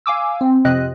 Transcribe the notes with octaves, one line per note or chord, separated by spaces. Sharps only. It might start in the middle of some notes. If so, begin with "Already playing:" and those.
F5 G#5 D6 E6
C4
F2 C3 C4 D#5 F#6